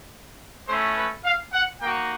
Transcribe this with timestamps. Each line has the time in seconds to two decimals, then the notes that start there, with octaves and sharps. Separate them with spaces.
0.67 A3 C#4 E4 C5
0.96 B4
1.25 F5
1.53 F#5
1.81 A#3 D#4 F#4 G5